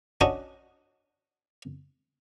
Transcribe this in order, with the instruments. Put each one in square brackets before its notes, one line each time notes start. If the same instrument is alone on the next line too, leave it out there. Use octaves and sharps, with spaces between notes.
[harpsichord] C#4 D4 F#4 D#5